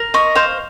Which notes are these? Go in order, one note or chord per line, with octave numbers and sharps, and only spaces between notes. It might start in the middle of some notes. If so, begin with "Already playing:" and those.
Already playing: A#4
D#5 C#6
C5 F5